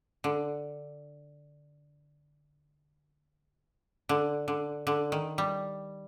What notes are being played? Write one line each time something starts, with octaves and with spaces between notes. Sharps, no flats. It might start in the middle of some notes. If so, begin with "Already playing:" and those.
D3
D3
D3
D3
D#3
G3